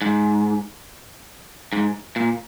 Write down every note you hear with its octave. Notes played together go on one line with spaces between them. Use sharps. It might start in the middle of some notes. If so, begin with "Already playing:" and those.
G#2
G#2
A#2